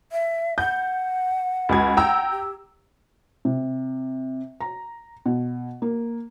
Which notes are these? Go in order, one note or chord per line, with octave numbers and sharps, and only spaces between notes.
E5
F#5 G6
C#2 F#4 G#6
G5 A#5 E6
G4
C3
A#5
B2
A#3